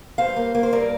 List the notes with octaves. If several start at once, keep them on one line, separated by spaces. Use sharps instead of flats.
G2 C5 F5
A#3
A#3
C5
G2 A#4 D5